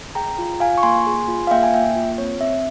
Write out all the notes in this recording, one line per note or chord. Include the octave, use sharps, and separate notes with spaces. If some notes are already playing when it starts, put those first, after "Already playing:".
G#4 G5 A#5
F4
F4 F5 G#5
C#6
A#3 G#5 C6
G#4
F4
F5
A#3 E5 G5
G#5
A#3 E5 G5
F4
C4 C#5
C4 E5